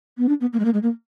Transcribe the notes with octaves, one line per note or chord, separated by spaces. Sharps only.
B3
D4
B3
A#3
G#3
A#3
G#3
A#3